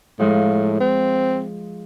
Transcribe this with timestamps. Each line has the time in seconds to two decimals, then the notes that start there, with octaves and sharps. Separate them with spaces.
0.19 A2 F3 G#3
0.80 C4